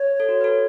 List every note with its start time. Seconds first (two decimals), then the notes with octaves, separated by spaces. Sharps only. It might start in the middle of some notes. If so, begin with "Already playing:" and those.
Already playing: C#5
0.20 A4
0.29 F#4
0.41 B4
0.44 A4